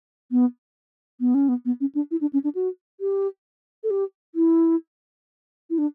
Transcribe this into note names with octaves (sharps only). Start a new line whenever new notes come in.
B3
B3
C#4
B3
B3
C#4
D4
E4
D4
C#4
D4
F#4
G4
A4
G4
E4
E4
D4